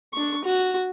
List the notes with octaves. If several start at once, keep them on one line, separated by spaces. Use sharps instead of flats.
D4 C#6
F#4